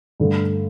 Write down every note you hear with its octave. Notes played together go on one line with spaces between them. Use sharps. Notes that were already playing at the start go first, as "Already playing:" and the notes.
G2 D3 A3